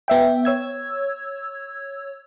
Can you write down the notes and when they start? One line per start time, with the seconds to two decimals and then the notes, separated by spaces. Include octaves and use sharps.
0.08 B3 E5 G5
0.45 C#5 E6 G#6